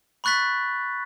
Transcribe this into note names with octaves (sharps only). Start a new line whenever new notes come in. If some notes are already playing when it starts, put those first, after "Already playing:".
B5 C#6 F#6 A6 B6